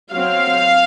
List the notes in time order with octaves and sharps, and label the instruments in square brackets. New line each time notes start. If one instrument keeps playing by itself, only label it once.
[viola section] F#3 C4 F5